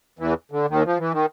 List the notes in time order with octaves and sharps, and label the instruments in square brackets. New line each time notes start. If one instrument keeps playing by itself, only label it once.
[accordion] E2 E3
D3
D#2 D#3
F3
E3
D#3